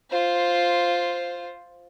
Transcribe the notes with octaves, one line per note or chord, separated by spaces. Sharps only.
F4 C5